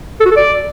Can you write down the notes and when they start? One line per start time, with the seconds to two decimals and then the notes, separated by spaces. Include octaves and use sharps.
0.20 A4
0.25 F#4
0.31 A4
0.36 D5